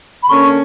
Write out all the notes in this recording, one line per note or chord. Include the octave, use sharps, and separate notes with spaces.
B5
D3 A#3 C#4 C#6